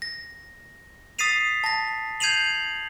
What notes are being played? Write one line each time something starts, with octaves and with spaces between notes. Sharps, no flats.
A#6
D#6 A6 B6 C7 D#7 F7
A5 A#6
G6 G#6 C7 D#7 F7 F#7